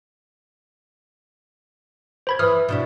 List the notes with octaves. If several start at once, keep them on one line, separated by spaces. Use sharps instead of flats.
C5 B5 G#6
E3 D#6 F6
B2 D4 E4